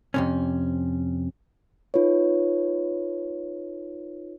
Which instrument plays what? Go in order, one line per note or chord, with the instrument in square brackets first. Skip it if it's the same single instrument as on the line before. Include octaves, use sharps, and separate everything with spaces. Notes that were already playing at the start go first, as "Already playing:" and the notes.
[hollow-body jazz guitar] F2 C3 C#4
[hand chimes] D#4 F4 B4 C#5